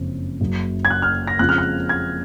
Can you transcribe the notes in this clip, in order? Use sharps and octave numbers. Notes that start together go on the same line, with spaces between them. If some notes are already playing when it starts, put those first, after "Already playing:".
Already playing: F#1 F2 C#3
F#1 F#2 C#3 F#3
G#6
F#6
F6
A#6
F2 C#3 F3 G#3 F#6
F6
F#6
G#6